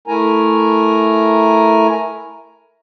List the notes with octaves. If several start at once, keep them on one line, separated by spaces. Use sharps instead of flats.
A3 E4 A#4 G#5 A#5